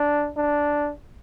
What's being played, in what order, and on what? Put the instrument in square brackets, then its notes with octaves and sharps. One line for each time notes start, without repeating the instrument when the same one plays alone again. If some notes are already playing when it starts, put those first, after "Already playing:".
Already playing: [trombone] D4
D4